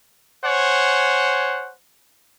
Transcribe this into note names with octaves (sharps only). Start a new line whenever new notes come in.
C5 C#5 F#5 G#5